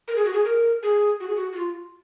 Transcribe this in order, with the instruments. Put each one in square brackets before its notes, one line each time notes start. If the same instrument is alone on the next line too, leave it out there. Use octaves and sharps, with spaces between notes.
[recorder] A#4
G#4
F#4
G#4
A#4
G#4
F#4
G#4
F#4
F#4
F4